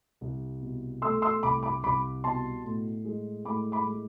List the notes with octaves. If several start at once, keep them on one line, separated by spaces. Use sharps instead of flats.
C2
B2
A3 C6 E6
C6 E6
C2 B5 D6
B5 D6
C2 B5 D6
B2 A5 C6
A2
G#3
A2 B5 D6
B5 D6
G#3